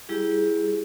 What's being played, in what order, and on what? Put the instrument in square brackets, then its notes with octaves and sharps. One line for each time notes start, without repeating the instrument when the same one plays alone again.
[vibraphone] G3 E4 G4 G#4